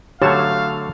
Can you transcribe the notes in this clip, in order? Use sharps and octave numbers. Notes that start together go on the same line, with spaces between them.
D3 F#3 A3 G4 C#5 F5 A5